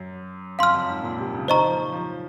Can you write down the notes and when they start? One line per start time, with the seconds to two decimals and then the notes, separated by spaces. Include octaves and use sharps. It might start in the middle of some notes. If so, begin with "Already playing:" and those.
Already playing: F#2
0.59 F2 F5 C6 F6
0.74 F#2
0.89 G#2
1.03 A#2
1.19 C3
1.34 C#3
1.48 D#3 C5 D#5 A#5 C#6
1.63 F3
1.93 F3